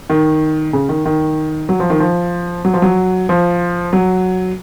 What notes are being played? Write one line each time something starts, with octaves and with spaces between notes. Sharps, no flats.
D#3
C#3
D#3
D#3
F#3
F3
D#3
F3
F#3
F3
F#3
F3
F#3